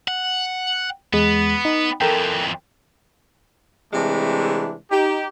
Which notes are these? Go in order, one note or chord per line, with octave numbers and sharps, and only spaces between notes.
F#5
E2 G#3 B3
D#4
F2 E3 A4 A#4 G5
C3 E3 G#3 A3 D4
D#4 G4